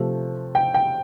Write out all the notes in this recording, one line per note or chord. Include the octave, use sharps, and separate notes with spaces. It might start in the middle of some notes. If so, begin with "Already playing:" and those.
Already playing: C3 F3 A3
G5
G5